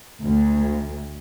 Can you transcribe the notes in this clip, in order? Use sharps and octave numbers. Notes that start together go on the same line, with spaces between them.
D2